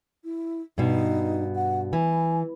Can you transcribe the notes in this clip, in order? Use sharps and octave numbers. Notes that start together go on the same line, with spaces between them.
E4
G2 B2 D#4
F#5
E3 G#5